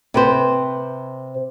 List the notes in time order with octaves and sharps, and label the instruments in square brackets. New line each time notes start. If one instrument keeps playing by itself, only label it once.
[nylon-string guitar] C3 B4 C5